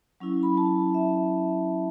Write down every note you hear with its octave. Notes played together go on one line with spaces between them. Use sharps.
F#3 C#4 E4
B5
A5
E5